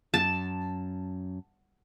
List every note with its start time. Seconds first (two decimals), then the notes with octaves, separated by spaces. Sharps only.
0.14 F#2 A5